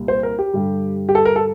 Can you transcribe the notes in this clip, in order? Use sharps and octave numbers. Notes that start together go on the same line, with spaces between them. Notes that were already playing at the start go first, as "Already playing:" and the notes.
Already playing: C2 A#2 G3
C5
A#4
G4
G2 D3 G3
G4
A4
A#4
A4